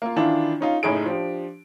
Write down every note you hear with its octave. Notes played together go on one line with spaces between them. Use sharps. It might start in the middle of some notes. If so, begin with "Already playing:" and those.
A#3 F4
D#3 E3 D4 E4 F4
C#4 D#4 F4
F#1 A2 D#4 G#4 D7
F3 D4 G4